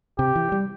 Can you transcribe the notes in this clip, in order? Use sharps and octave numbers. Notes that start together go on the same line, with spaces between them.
C3 G4
E3
G3